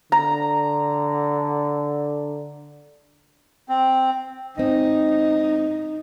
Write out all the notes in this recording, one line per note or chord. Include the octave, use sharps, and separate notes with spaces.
D3 A#5
C4
G#2 C4 D#4 D#5